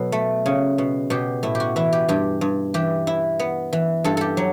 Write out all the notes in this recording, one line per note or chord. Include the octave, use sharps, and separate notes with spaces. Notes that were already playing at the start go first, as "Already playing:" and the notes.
Already playing: B2 F#3 A4 B4
A3
C#3
B2
B2 G4
A2 E4
G4
F#4
E3 E4
G4
G2 G4
G2
E3 G4
E4
B3
E3
G2 A4
G4 A4
F#3